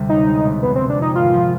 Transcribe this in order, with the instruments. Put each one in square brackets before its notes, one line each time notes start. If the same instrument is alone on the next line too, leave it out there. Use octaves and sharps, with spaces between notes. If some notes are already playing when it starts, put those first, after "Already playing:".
Already playing: [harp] D2 C3 G3
[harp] B1 [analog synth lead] D#4
[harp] G#3
B2
[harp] F1 [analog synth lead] B3
[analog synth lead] C4
[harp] C3
[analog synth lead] D4
[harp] F2 [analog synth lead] D#4
[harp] G#1 [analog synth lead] F4
[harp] F3